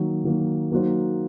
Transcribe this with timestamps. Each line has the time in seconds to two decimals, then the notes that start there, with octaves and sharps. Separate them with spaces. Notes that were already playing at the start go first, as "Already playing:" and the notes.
Already playing: D#3 F#3 A#3
0.24 D#3 F#3 A#3
0.72 F#3 A#3 D#4 F#4 C5